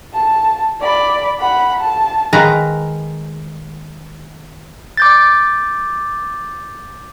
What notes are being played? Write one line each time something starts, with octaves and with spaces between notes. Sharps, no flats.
A5
D5 B5
F#5 B5
A5
D#3 G#3 B4 F5 A#5
D6 G6 A6